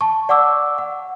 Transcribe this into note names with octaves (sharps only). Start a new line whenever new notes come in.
A5 C#6
D5 F#5 C#6 D6 E6
F#5